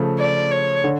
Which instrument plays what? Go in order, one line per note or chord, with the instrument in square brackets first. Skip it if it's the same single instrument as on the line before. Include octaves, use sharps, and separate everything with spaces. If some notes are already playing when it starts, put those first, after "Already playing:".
Already playing: [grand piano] C#3 F3 A3
[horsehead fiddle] D5
C#5
[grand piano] D3